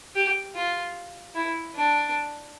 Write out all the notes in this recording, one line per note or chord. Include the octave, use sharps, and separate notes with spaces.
G4
F4
E4
D4